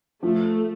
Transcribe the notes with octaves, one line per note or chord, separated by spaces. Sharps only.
F3 A3